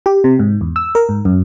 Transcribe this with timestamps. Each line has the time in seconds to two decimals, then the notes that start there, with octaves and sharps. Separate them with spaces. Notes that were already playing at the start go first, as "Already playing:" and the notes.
0.06 G4
0.24 C3
0.39 G#2
0.61 E2
0.76 E6
0.95 A#4
1.09 G#2
1.25 F#2